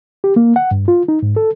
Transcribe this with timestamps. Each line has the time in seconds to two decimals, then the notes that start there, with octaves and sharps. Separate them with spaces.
0.24 G4
0.36 A#3
0.56 F#5
0.71 G2
0.88 F4
1.08 D#4
1.23 G#2
1.36 A4